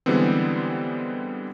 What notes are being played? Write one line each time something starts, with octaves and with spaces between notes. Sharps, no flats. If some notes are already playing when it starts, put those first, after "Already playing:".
D3 E3 G3 G#3 B3 C4